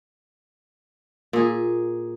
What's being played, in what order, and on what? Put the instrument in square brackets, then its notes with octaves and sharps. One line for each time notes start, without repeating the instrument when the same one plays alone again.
[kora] A#2 G#4